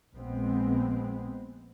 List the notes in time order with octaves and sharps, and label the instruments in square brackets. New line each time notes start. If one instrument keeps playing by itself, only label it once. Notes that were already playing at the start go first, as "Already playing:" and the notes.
[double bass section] A#1 G#3 B3 C4